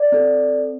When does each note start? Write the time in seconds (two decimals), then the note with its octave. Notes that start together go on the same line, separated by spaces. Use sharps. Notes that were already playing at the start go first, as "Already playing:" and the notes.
Already playing: D5
0.12 C4 A4